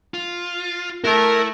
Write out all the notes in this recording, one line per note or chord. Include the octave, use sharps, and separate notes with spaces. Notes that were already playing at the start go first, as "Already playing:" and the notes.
F4
A3 E4 A#4